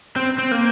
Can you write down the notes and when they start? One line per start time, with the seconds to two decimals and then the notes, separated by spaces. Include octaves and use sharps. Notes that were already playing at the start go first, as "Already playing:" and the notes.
0.16 C4
0.38 C4
0.51 A#3